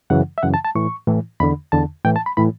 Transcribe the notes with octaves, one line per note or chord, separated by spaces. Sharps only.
F#2 C#3 E3 F#5
E5
F#2 C#3 E3 F#5
A5
A5
A2 E3 C#6
A2 E3
E2 D3 B5
E2 D3 A5
A2 E3 G5
A5
B5
A2 E3 B5